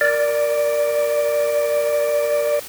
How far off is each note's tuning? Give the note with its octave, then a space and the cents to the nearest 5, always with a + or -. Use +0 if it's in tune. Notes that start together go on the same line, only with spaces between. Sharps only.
A#4 +5 D5 +0